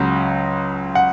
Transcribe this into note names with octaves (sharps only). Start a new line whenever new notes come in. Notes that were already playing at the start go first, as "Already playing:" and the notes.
Already playing: C#2 C#3 F#3
F#5